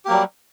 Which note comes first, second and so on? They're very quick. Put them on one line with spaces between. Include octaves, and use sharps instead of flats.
G4 A#3 F#3 G3